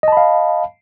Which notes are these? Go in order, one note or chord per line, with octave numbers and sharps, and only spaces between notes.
D#5 F5 A5 B5